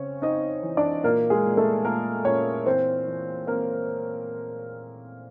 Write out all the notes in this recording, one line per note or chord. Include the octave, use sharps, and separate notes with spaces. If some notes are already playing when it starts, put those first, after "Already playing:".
Already playing: C#3 C4 C#4 C#5
C4 D#4 D#5
E3
D4 D5
A#2 A#3 A#4
G#3 G#4
A#2
A3 A4
A#2 A#3 A#4
A#2 C#4 C#5
E3 C4 C5
E3
A#3 C4 A#4